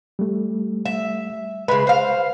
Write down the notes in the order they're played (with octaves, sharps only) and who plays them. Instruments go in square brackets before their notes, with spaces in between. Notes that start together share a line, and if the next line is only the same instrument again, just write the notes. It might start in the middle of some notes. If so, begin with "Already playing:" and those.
[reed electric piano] G3 A3
[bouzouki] E5
[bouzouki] C#3 G#3 [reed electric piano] B4 B5
[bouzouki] C5 F5